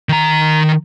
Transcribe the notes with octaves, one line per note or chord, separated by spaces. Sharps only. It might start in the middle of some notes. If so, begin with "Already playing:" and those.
D#3 A#5